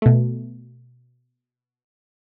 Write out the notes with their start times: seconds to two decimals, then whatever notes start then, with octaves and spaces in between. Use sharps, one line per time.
0.02 B2 A3